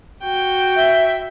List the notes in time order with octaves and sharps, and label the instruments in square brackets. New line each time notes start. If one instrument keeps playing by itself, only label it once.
[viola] F#4 G5
[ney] E5